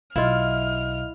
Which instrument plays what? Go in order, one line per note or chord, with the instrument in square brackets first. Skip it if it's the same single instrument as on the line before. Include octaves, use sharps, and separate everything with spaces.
[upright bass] B1 [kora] E4 F4 [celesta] D#5 F5 [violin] F6